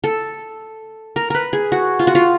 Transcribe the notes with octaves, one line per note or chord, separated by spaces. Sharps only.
A4
A#4
A#4 B4
G#4
F#4
F4
F#4
F4